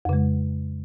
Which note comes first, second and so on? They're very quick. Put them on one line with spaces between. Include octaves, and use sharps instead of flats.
F2 C#3 G#3